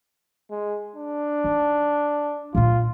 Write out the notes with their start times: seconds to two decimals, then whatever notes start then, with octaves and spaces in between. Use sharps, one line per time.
0.51 G#3
0.96 D4
1.44 D#4
2.55 A#2 D4 F4